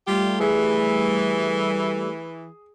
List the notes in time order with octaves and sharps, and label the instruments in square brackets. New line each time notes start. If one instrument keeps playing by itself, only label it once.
[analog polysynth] G3 A3 [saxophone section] F4 G4
[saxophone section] E3 [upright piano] G#4